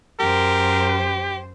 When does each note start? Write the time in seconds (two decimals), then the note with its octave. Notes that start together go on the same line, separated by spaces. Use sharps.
0.20 F#2 G4 A#4 C5